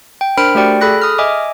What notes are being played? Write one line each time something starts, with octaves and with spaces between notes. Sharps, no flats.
G5
D4 A#4 C5 B5 F6 D7
A3 F#4 G4 D5 G5 C#7
G#4 A4 B5 F#6 A#6
D#6 F6
D#5 E5 G#5 D6